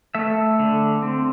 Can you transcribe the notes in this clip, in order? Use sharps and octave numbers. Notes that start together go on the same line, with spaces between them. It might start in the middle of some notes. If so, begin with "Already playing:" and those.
A3 E5
D3
C4